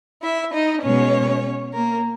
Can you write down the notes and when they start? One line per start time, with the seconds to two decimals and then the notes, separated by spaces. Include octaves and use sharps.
0.23 E4 E5
0.54 D#4 D#5
0.84 B2 G#3 B3 C#4 C#5
1.74 A#3 A#4